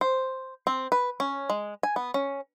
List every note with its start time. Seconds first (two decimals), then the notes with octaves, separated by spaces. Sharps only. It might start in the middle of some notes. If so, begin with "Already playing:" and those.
0.01 C5
0.67 C4
0.92 B4
1.20 C#4
1.50 G#3
1.83 G#5
1.96 B3
2.14 C#4